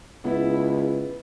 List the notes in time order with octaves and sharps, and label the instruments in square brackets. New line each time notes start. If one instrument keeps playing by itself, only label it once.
[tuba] C#2 [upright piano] B3 [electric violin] E4